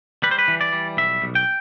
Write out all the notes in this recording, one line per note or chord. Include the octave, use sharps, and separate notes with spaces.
G3 B4
C5
B4
E3
D5
G3
B1 E5
B1
G5